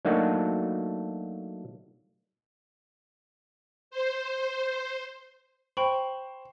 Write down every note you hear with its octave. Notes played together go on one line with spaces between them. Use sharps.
F#3 A3 A#3 D4 D#4 F#4
C5
C5 G5 B5 C#6